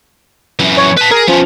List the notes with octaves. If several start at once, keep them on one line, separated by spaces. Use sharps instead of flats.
F#2 E3
C#5
B4 A5 B6
G#4 A#4
F3 B3 C#4